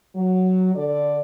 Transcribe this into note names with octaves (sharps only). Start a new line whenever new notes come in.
F#3
D3 D5